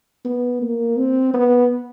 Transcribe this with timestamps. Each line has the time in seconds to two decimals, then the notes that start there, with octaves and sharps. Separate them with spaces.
0.25 B3
0.62 A#3
0.97 C4
1.34 B3